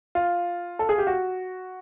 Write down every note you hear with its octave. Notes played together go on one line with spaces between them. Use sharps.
F4
A4
G#4
G4
F#4